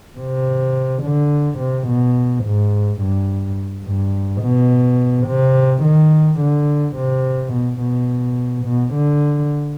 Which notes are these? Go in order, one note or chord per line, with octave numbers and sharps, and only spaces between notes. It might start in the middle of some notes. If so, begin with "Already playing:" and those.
C3
D3
C3
B2
G#2
G2
G2
B2
C3
D#3
D3
C3
B2
B2
B2
D3